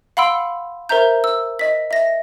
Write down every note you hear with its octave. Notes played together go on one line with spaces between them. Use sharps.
F5 F#5 B5 C6 E6 D7
A#4 C5 E5 A#5 G6
E6
D#5 B6
E5 A#6